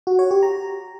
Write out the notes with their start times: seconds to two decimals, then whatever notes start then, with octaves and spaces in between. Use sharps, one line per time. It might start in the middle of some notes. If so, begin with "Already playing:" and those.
0.07 F#4
0.19 C#5
0.31 G4
0.43 A#5